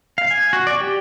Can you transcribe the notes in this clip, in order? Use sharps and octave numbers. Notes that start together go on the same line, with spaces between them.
F5
G#5
F#4
D5
G4